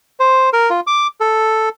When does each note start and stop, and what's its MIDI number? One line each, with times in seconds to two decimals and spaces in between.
0.20 0.50 72
0.53 0.70 70
0.70 0.80 65
0.87 1.07 86
1.20 1.69 69